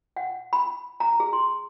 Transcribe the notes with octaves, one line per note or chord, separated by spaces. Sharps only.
F#5
B5
A#5
G#4
C6